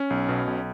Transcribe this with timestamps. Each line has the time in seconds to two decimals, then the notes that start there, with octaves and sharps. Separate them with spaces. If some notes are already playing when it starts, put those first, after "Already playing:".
Already playing: C#4
0.10 B1
0.29 B2
0.47 B1